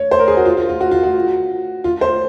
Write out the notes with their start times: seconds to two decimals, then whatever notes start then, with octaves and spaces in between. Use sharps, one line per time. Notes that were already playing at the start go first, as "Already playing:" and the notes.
Already playing: C#5
0.11 C5
0.19 A#4
0.28 G#4
0.37 F#4
0.45 F4
0.57 F4
0.69 F4
0.81 F#4
0.91 F4
1.03 F#4
1.84 F4
2.01 C5